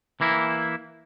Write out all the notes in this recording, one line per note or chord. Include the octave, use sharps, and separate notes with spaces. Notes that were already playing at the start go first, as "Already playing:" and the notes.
E3 A#3 E4